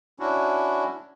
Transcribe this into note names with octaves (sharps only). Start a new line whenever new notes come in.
C#4 D4 E4 F#4